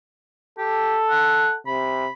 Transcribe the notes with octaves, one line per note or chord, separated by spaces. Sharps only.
G4 A4
F#5
C3 B5